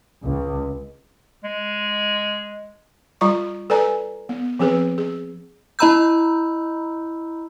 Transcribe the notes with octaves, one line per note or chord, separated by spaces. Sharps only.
C#2
G#3
G3 F4 A#5 C#6
A4 B4 D5 G#5 A#5
B3
F3 C4 G#4 B4
G#4
E4 D#5 A#5 B5 E6 G6